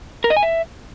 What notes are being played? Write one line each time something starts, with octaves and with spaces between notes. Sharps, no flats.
A#4
D#5
G#5
E5